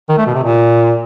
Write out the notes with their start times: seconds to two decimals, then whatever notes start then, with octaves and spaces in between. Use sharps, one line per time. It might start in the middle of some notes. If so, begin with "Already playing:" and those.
0.09 D#3
0.18 A3
0.26 B2
0.35 C3
0.44 A#2